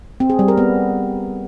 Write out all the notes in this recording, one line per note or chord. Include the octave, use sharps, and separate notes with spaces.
C4
G#4
G3
A#4
B3